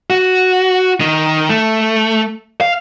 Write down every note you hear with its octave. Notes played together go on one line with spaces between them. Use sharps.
F#4
D#3
A3
F5